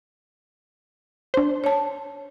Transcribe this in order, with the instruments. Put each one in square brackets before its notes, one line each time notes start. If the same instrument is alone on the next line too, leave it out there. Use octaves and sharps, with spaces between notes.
[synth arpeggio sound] D4 C5
[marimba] C#5 A5